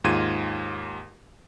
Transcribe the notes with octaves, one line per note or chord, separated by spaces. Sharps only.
D#2 G#2 F4 G#6 D#7